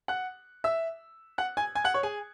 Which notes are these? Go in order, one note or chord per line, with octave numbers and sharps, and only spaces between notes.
F#5 F#6
E5 E6
F#5 F#6
G#5 G#6
G#5 G#6
F#5 F#6
C#5 C#6
G#4 G#5